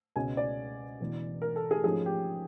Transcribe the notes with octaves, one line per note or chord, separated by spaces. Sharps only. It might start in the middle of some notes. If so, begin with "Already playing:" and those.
C#2 B2 G#3 C#4 G#5
D5
E1 E2 B2
A#4
A4
G#4
G#2 F3 A3 C#4 G#4
G4